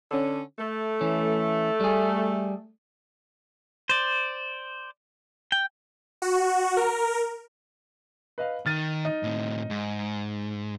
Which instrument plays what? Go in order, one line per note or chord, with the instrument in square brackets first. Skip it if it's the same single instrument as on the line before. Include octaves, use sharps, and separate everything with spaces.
[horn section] D3 C#4
A3
[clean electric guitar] E3 C#4
G3 G#4
[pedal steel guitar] C5 D5
G5
[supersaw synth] F#4
A#4
[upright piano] B4 D#5 F5
[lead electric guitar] D#3 [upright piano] F6 A6 D#7
[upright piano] D#4
[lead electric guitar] A2 C4
G#2